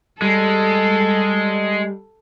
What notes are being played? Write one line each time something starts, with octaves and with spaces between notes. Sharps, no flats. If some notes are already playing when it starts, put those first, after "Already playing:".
G3 G#3 A4